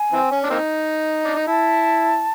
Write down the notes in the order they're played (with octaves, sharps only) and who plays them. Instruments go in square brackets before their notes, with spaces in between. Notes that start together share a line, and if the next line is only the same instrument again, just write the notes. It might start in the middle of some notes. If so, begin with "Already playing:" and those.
Already playing: [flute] G#5
[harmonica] E3 C4
C#4
D4
A#3 C4 D#4
D4
D#4
[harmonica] E4 [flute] A5